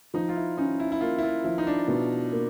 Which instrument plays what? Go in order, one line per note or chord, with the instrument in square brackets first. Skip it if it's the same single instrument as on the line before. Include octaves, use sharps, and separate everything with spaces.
[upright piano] F3 [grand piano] D#4
[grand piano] F4
E4
[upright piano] C#4 [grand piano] D#4
[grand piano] E4
E4
[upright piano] A#3 [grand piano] F4
[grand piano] E4
F4
[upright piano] F3 [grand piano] E4
[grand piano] D#4
D4
[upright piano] B2
A#3